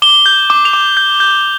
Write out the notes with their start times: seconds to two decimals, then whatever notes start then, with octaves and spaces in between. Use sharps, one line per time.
0.02 D6 G7
0.26 G6
0.50 D6
0.65 F7
0.73 D6
0.97 G6
1.20 G6